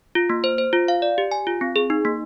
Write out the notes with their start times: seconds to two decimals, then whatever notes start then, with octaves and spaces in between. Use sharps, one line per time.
0.15 F4
0.30 A#3
0.44 C5
0.58 C5
0.73 F4
0.88 F5
1.02 D5
1.18 G4
1.32 G#5
1.47 F4
1.61 C4
1.76 G#4
1.90 D#4
2.05 A#3